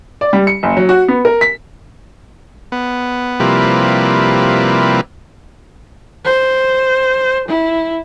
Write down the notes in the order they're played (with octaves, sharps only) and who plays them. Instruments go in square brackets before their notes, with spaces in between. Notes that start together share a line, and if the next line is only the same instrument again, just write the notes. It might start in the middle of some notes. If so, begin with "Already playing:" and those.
[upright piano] D5
G3
C#7
F#1
F#3
F#4
B3
A#4
B6
[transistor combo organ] B3
C3 F3 G3 A#3 E4 B4
[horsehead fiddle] C5
E4